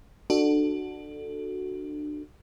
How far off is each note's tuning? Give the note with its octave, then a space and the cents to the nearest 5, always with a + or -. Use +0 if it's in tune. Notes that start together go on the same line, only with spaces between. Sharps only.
D4 +25 F#4 +0 A4 +0